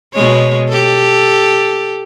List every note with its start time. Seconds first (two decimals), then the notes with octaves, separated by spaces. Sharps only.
0.14 B2 G#3 C#5
0.69 G4 A4